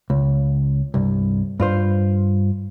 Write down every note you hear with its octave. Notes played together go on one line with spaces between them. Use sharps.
C#2
C2 G2
G2 F4 C5